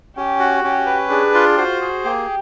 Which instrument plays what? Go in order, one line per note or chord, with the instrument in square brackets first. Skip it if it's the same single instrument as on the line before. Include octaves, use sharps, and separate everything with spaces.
[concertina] C#4 [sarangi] G4
[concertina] F#4
[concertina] C#4 [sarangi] G4
[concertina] B4
[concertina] D4 [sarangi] G#4
[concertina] F4
[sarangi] F#4 [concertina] C5
[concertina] G#4
[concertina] A#3 [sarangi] G4